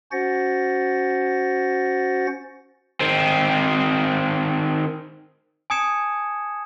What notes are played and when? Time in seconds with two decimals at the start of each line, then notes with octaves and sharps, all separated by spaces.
0.12 C#4 F#4 C5 F#5 A6 A#6
3.00 D#3 C4
5.70 G#5 A5 D#6 G#6 C#7 E7